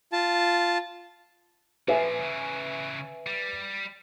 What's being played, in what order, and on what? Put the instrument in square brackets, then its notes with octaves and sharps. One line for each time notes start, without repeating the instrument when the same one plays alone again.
[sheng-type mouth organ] F4 A5
[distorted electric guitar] A#2 F3 [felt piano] B4 E5 G#5
[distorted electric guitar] C#3 E3
G3